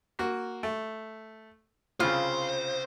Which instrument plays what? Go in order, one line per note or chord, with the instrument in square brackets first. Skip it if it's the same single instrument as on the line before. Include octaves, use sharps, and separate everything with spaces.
[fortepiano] A#3 F#4
A3
[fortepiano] C2 C#3 [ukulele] F4 [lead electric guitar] C5